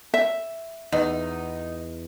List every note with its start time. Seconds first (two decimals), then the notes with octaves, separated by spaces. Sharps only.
0.14 E5
0.92 E2 D#4